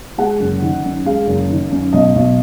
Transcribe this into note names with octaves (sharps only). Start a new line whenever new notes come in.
G#3 F#5
F#1
D#3
F#2
G#3 F5
F#1
D#3
F#2
B1 D#5
B1